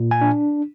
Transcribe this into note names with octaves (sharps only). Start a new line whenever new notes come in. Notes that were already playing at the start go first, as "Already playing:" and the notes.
Already playing: A#2
G#5
D4